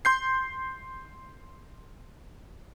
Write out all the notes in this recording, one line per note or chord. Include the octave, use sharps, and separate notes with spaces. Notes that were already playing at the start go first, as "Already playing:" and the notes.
C6 G6 C7